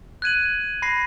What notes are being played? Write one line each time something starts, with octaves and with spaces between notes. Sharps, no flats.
F#6 G#6 D#7 F#7
B5 A#6 C7